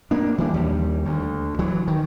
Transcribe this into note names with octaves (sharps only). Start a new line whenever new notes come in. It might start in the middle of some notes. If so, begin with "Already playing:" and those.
A#3 D4
E3 G3 D4
D#2 G3
D2
E3 F#3
D#3